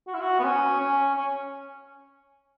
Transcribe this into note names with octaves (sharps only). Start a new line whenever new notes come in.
F#4
E4
F#4
B3
C#4
C#4
C#4